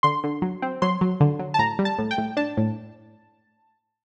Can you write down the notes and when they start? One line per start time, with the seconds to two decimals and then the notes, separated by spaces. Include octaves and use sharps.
0.03 D3 C6
0.24 D3
0.42 F#3
0.62 C4
0.82 F#3 C6
1.01 F#3
1.20 D3
1.39 F#3
1.54 A5
1.59 A2 A#5
1.79 G3
1.85 A5
1.99 A2
2.11 G5
2.18 A2
2.37 D4 A5
2.57 A2